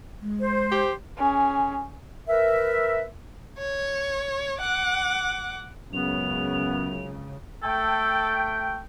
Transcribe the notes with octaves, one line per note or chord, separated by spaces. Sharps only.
G#3
C5
G4
C#4 G#4
A#4 B4 E5
C#5
F#5 D6
C#2 F#2 C#3 B3 F7
A3 A4 G5